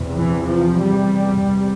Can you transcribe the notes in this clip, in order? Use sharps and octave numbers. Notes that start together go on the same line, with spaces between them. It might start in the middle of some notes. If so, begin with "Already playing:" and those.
Already playing: E2 C3
E3
F3
G3
E2 C3